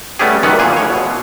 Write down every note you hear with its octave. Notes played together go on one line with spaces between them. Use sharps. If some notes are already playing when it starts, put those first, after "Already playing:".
G3 A3 B3 C#4 G4 G#4
F#2 D#3 E3 B3 C#4 F#5
A#2 G#4
A2 C#5
B2